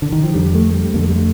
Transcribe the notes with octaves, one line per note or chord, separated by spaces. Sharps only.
D3
D#3
F3
F2 D3 G3
A3
G3
F2 D3 A#3
A3
G3
A3